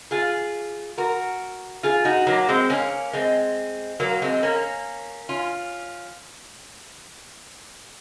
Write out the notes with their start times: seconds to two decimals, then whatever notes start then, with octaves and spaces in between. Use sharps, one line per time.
0.11 F4 G#4
0.98 F#4 A#4
1.83 F4 G#4
2.05 D#4 F#4
2.27 F#3 A#3
2.49 G#3 C4
2.70 A#3 C#4
3.13 G#3 C4
4.00 F#3 A#3
4.22 G#3 C4
4.42 A#3 C#4
5.29 C#4 F4